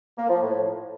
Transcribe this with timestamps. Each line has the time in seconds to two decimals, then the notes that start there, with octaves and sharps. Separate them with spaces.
0.17 A#3
0.29 F3
0.41 A2